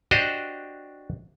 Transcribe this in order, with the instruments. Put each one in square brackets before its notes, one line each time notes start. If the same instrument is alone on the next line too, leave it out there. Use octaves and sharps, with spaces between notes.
[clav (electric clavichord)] D4 F#4 G4 C5 D#5